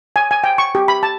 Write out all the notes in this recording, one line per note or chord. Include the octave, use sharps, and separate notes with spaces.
G#5
G#5
G5
C#6
G4
B5
A5